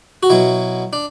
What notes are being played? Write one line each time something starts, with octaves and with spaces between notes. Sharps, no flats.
F#4
B2 F#3 E4
D4